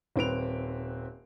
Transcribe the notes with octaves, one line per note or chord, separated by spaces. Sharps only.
D#1 C4 B4 D7 F7